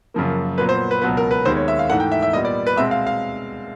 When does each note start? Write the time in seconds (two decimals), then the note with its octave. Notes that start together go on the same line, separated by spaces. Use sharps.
0.14 F#2 C#3 F3 A#3
0.58 A#2 F#3 B3 B4
0.69 C5
0.91 B4
1.02 C#2 B2 F#3 B3 B4
1.17 A#4
1.31 B4
1.45 D#2 D#3 G#3 B3 C5
1.56 C#5
1.68 E5
1.79 F5
1.90 G#2 E3 A3 F#5
2.00 G5
2.12 E5
2.22 E5
2.33 A#2 G3 B3 D#5
2.45 D5
2.67 B4
2.76 B2 G#3 C4 E5
2.91 F5
3.07 F5